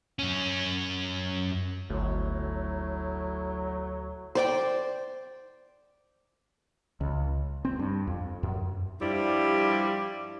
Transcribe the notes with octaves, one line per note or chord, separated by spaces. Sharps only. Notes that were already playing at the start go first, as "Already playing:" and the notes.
F#2 C#4
G1 D2 A2 F#3
C5 D5 G5
C#2
C4
G2
F2
F#2
G2 F3 G3 E4